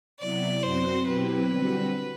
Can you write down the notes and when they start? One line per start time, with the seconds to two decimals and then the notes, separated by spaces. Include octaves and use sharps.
0.20 C3 F#3 B3 E4 D5
0.63 F#2 F#3 C4 F#4 C5
1.07 B2 F#3 C4 E4 G4 B4
1.50 D3 G3 C4 F#4